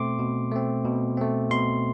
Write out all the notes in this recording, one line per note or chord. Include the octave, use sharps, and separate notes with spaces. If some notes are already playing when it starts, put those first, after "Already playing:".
Already playing: B2 A3 C4 C6 D6
B2
A3 C4
B2
A3 C4
B2 C6